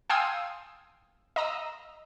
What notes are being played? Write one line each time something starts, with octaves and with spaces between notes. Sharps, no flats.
F5 G5 G#5 C6 D#6 E6
D#5 A#5 E6